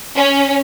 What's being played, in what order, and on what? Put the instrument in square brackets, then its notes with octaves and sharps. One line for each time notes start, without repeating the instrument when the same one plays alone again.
[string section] C#4